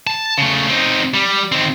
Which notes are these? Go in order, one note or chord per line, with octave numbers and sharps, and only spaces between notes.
A5
C#3 A3
C4 D#4
G3
D#3 C4